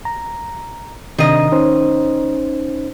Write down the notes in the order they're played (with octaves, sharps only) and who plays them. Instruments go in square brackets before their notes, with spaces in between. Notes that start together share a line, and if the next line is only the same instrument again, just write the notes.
[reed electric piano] A#5
[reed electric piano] C3 D4 [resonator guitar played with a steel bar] D#3 D#5
[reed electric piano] C#4 D#4 C5